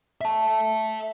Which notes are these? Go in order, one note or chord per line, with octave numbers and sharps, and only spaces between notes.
E5 A5